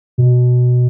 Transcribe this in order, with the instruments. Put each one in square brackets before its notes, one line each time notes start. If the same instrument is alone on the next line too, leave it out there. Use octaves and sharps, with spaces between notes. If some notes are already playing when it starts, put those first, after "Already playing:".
[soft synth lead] B2